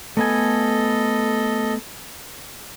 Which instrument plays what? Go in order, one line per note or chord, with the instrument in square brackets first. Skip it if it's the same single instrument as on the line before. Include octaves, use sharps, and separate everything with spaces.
[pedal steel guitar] A3 B3 G#5 [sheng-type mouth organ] A4 D#5